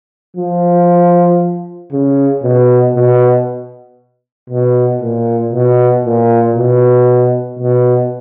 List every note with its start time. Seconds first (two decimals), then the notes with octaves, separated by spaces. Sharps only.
0.37 F3
1.92 C#3
2.44 B2
2.96 B2
4.50 B2
5.01 A#2
5.53 B2
6.05 A#2
6.56 B2
7.60 B2